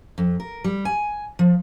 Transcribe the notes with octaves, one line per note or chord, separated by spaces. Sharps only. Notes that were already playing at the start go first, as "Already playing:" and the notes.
F2
A#4
G3
G#5
F3